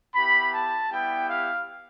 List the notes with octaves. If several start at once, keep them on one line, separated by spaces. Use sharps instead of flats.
B3 E4 G4 B5
A5
G3 B3 E4 G4 G5
F5